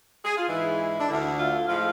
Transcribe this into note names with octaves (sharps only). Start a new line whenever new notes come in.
G#4
F4
G#2 E3 G#3 E4
D4
D2 D3 A3 E4
F4
A2 F3 G#3 F4